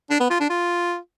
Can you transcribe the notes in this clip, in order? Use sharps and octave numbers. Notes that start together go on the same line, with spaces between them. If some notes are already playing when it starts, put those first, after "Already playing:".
D4
B3
F4
D4
F4